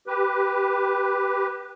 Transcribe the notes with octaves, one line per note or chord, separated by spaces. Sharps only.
G4 B4